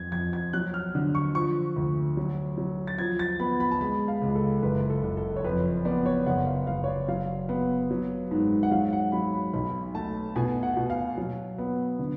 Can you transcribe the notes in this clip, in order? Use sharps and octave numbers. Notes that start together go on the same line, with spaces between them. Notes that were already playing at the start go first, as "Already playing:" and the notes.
Already playing: F2 G#6
F2 G#6
G#6
F#3 F#6
F6
D3
C#6
F3 C#6
D2
F#3
F#3
A6
F3 G#6
A6
B3 B5
B5
A5
G#3 B5
F5
C#2
A4
F#1 B4
A4
F#1
A4
C#5
F2 B4
B3 D5
C#5
F#1 F#5
F5
F#1 F5
C#5
D5
F#3 F5
B3
F#3
G#2
F#5
F#3 F5
F#5
F#3 B5
B5
B1 B5
A3 A5
B2 G#5
F#5
B2
F5
F#3
B3
D3